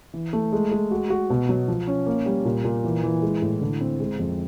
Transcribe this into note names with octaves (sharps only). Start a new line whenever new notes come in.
E3
A3
G#3
G#3
F#4
F#4
B2
F#3
F3
C#4
A#3
G3
A#2
A#2
E3
E3
G#3
A2
D3
C4
G#3
F2